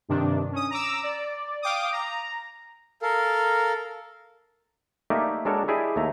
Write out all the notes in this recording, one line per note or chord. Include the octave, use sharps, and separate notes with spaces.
G2 C3 D#3 D4
C#4 D#6
A#5 D6 E6
D5
F5 G5 D6 D#6
A#5
A4 A#4 F5
A3 A#3 D#4 G4 D5 E5
G#3 D4 F#4 A4 A#4 C#5
E4 G4 G#4 D5 D#5
D#2 A3 E5 A#5